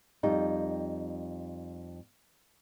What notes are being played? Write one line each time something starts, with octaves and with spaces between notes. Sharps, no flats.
F2 G3 D#4